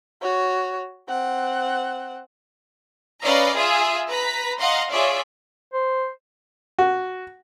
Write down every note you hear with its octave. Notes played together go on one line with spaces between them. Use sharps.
F#4 C#5
C4 F#5
C#4 B4 D5 D#5 F5 A#5
F4 G#4 E5 G#5 D#6
B4 A#5 B6
D#5 F5 F#5 A#5 C6
F4 G#4 C#5 D5 E5
C5
F#4